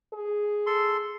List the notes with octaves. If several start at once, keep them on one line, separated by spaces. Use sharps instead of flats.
G#4
A4 C6